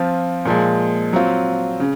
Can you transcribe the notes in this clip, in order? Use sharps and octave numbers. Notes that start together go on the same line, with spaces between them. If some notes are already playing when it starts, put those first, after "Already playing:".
Already playing: F3 C4 F4
A#2 F3 G#3
F#3 C4 F4
C#3